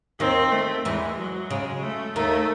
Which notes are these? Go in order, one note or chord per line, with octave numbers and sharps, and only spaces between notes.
D#2 D#3 C4
A3
E2 E3 G#3
F#3
C#3 G#3
A3
D#2 D#3 A3